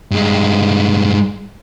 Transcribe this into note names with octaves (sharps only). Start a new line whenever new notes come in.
G2 G#3